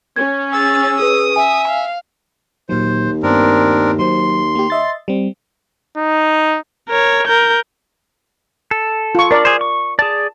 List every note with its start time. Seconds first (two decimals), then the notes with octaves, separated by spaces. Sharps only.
0.16 C#4 G#6
0.53 G#4 E6 A6
0.99 G#4 B4 D#6
1.36 E5 G#5
1.68 F5
2.69 D#2 A#2 F#3 C5
3.23 G2 B3 C4 D4 A#4
3.99 F#3 C5 C6
4.55 A#3 G4
4.70 D#5 E5 A6
5.08 G3 C4
5.97 D#4
6.89 A#4 C#5
7.27 A#4 G6
8.71 A4
9.15 F4 C#6
9.31 D4 A#4 D5
9.45 G#4 C5
9.61 C#6
9.99 G#4 D5 A5